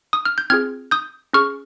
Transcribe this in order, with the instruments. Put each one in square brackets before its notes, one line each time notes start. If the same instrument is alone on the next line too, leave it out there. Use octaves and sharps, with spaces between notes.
[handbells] D#6
F6
G6
C4 F4 G#4 F6 G#6
D#6 G6
C#4 G#4 C#6 F6